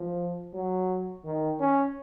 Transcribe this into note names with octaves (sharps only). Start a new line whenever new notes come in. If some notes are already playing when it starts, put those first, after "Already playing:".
Already playing: F3
F#3
D#3
C#4